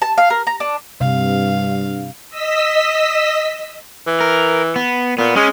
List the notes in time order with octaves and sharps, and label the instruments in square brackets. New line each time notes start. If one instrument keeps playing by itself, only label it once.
[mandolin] A5
F5
A#4
A#5
D4
[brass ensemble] G2 [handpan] C3 [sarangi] F5
[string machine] D#5 E6 B6
[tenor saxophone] E3
[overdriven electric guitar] A#4
B3
[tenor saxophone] A#2 [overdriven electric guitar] B3
[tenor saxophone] G#3 [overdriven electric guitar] C#4